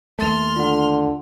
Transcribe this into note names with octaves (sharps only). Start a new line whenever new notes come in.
D#2 A3 E5 C6 F6 A6
D3 F4 F#5